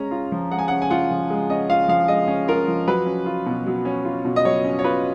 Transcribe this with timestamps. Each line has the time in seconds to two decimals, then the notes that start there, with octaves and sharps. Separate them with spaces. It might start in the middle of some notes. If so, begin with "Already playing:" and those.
Already playing: G#3 C#4 A#5
0.11 F4
0.32 F3
0.51 G#3 F#5
0.59 G#5
0.68 C#4 F#5
0.82 G#5
0.90 F4 F#5
1.11 F3
1.30 G#3
1.50 C#4 D#5
1.69 F4 F5
1.88 F3 F5
2.08 G#3 D#5
2.28 C#4
2.48 F4 A#4
2.68 F3
2.87 F#3 B4
3.06 C#4
3.26 F4
3.46 B2
3.66 F#3
3.85 C#4
4.05 F4
4.25 B2
4.36 D#5
4.45 F#3 C#5
4.65 C#4
4.79 C#5
4.84 F4 B4